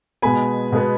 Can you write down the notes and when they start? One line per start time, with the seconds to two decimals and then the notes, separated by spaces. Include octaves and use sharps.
0.22 B2 G#3 B3 G#5 B5
0.72 B2 G#3 B3